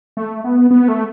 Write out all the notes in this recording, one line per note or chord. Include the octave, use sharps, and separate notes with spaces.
A3
B3
B3
A3